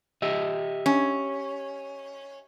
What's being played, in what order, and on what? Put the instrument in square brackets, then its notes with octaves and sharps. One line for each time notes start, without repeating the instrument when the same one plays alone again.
[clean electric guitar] G4 D#5 E5
[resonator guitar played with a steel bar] C#4